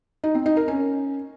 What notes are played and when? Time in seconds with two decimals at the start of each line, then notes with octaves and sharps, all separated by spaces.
0.24 D#4
0.35 C4
0.46 D#4
0.57 A#4
0.68 C#4